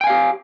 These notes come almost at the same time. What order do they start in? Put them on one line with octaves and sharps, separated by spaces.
G5 G#5 F5 G4